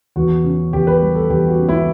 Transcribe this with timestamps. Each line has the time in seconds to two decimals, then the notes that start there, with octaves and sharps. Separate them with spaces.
0.16 E2 F#4
0.44 C#3
0.73 E2 G4
0.87 B4
1.01 G3
1.15 A4
1.30 E2 G4
1.48 F#4
1.59 C#3
1.68 E4